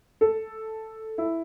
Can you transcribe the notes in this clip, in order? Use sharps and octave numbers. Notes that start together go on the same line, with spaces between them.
A4
E4